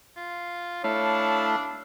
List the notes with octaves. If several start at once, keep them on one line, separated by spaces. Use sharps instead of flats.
F4
A3 D4 E4 C#5 F5